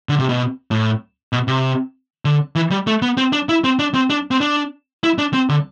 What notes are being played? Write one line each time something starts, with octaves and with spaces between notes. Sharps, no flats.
D3
C3
B2
A2
B2
C3
D3
E3
G3
A3
B3
C4
D4
E4
C4
D4
C4
D4
C4
D4
E4
D4
C4
D3